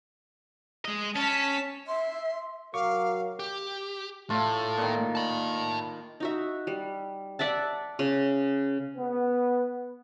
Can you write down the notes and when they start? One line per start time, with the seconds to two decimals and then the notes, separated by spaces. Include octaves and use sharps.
0.85 G#3 D#5
1.16 C#4 A5 B6
1.87 E5 C6
2.74 F#3 A#4 F5 C#6 D6
3.39 G4
4.30 A2 A3 F4
4.77 A#2 D#3
5.15 A5 B5
6.20 D#4 F#4 E5
6.67 G3
7.39 D5 E5 F#5 A5
7.99 C#3
8.97 B3